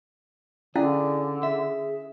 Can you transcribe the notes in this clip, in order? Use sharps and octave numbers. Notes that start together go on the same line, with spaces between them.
D3 C#4 E4 G#4 D5 F5
G#4 E5